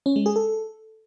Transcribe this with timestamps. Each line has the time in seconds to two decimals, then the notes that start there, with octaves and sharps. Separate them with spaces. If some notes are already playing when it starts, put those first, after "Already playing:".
0.06 C#4
0.16 G#3
0.26 G#4
0.36 A4